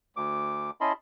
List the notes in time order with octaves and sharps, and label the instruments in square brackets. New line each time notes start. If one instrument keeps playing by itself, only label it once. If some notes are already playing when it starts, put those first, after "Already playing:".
[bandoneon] D2 D6
C#4 E4 D#5 A5 B5 C6